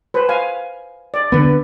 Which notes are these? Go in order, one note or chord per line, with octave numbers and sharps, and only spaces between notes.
B4 C5
F5 G#5
D5
D3 B3 B4